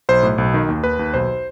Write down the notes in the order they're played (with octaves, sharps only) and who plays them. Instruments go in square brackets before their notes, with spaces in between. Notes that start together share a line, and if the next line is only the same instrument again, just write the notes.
[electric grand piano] B1 C5
A2
B1
D#3
D#2
D#2 B4
D#2
B1 C5